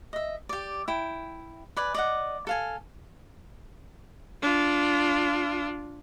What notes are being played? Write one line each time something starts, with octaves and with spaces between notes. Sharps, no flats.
D#5 E5
G4 D5
E4 G5
B4 D5 G#5
D5 D#5 F#5
A4 F5 G#5
D4 F4